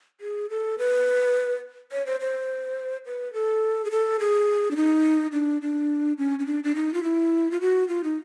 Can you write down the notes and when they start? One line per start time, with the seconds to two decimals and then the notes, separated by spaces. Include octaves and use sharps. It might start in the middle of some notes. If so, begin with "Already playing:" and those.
0.21 G#4
0.50 A4
0.78 B4
1.92 C#5
2.06 C5
2.20 C5
3.06 B4
3.33 A4
3.85 G#4
3.91 A4
4.20 G#4
4.71 D4
4.76 D#4
5.32 D4
5.62 D4
6.18 C#4
6.39 C#4
6.46 D4
6.64 D4
6.75 D#4
6.94 F4
7.03 E4
7.51 F4
7.61 F#4
7.88 F4
8.04 D#4